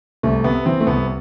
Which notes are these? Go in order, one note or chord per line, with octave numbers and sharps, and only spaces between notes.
C2 A3
C3 B3
E3 C4
A3
C2 B3